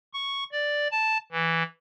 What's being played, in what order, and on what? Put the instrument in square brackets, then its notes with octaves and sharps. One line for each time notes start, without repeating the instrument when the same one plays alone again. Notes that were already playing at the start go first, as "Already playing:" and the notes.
[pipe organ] C#6
D5
A5
E3